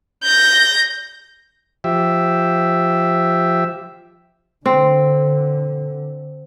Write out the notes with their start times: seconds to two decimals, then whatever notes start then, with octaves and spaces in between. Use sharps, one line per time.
0.24 G6 A#6
1.84 F3 G4 E5
4.66 D3 C4